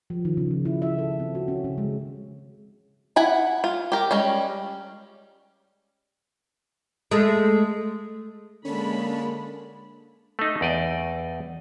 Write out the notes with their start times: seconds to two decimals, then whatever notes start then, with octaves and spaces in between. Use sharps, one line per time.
0.10 F3
0.25 D#3
0.37 C#3
0.51 F3
0.65 E4
0.82 E5
0.98 A4
1.20 C4
1.35 F#4
1.48 C#4
1.64 C#3
1.78 G#3
3.16 E4 F#5 G#5 B5
3.64 F4
3.92 G4 A#4
4.11 G3 G#3 C#4
7.11 G#3 A3
8.65 D3 G#3 A#3 C#4 A5 B5
10.39 A3 D#4
10.61 E2 D5 D#5